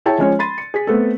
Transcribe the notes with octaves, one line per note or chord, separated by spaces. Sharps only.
E4 G#4 C#5 E5 G5 A5
F3 G#3 C#4 C#5
B5 C6 A6 D#7
C#7
G#4 B6
A3 B3 C4 A4